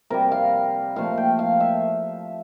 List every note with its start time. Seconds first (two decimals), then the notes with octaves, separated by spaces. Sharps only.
0.10 C3 G3 A#4
0.32 F5
0.96 A#2 F3 A3 F5
1.17 G5
1.39 F5
1.60 E5